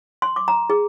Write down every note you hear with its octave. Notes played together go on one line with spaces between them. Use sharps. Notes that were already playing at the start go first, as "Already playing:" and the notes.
C6
D6
A#5
G#4